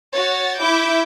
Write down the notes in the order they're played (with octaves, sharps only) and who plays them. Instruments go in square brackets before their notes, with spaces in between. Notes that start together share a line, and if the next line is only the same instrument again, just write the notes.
[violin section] F#4 C#5 A6
[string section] E4 [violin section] E5 D6 G6